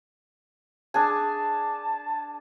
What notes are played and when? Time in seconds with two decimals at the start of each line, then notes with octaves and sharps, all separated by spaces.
0.94 D4 G#4 G#5 A5